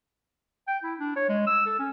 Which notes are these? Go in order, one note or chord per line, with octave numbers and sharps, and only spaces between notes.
G5
E4
D4
C#5
G#3
E6
A4
C#4